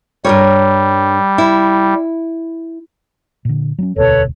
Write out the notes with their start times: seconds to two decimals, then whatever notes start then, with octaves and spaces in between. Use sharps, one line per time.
0.25 G2 G3 A#4 C#5
1.38 E4
3.45 A#2 D3
3.79 F#3 A#3 C#4
3.96 E1 D2 B2 A4 B4 C#5